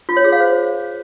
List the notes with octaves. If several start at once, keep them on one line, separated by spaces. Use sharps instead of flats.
F4
C#5
G#4
F5
C5